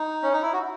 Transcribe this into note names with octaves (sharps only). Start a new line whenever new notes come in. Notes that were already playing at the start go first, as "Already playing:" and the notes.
Already playing: D#4
C#4
D#4
E4
F#4